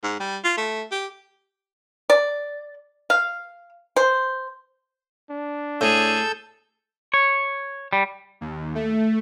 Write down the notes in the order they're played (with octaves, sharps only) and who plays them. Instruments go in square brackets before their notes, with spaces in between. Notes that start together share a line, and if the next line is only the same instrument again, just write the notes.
[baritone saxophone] G#2
G3
F4
A3
G4
[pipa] D5
F5
C5
[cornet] D4
[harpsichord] A2 [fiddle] G#4 [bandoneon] A4 E6 G6
[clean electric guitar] C#5
G3
[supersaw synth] D#2
A3